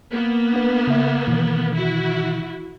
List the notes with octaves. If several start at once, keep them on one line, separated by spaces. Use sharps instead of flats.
A#3 B3
D4 B4
C#3 E5
B2 D#3 E3
E4 F#4